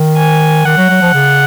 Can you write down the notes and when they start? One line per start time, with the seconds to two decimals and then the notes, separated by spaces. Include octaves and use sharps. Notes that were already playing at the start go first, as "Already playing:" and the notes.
Already playing: D#3
0.17 G#5
0.65 D#3 F#5
0.77 F#3
0.90 F#3
1.01 F3
1.14 C#3